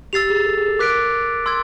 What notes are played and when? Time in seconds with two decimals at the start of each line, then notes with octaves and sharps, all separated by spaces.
0.13 G4 E6 A6 C7 F7
0.30 G#4
0.46 A4
0.57 G#4
0.68 A4
0.79 A#4 D6 F#6 B6 D7
1.46 C6 E6 G#6